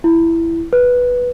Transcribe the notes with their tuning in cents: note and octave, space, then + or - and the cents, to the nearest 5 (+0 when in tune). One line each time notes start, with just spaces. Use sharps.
E4 +10
B4 -5